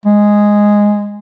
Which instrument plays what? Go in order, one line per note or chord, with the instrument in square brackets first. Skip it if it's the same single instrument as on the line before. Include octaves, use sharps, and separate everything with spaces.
[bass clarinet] G#3